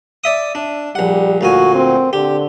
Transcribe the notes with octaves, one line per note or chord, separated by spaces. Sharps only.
D5 E5 D#6
D4
A#1 G3 F#5
D2 A#2 F#4 G#5
C4
D3 G4